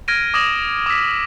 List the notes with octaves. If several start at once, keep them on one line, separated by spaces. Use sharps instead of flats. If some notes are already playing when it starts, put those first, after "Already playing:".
F6 G#6 A#6 D7 D#7
D6 D#6 G#6 A#6 E7 F#7
D6 E6 B6